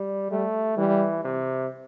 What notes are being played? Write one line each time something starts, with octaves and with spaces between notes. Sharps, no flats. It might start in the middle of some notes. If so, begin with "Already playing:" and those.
Already playing: G3
G3 A3
E3 G3
C3